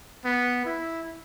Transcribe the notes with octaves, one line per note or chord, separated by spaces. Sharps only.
B3
E4